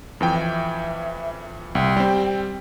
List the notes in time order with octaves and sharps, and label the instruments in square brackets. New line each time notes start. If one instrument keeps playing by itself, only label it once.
[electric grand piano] F2 E3 G5
[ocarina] E5
[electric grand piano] C2 [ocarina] G5
[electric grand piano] G3 C4